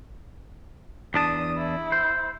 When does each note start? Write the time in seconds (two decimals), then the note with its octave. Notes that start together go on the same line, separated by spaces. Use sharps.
1.14 E2 D4 A5 D#6
1.57 E4
1.92 C5